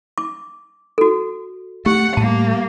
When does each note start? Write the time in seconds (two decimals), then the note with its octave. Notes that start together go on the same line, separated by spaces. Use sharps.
0.18 D6
0.98 F#4 A4
1.86 A3 G4 F#5
2.17 A2 G3 A#3 A5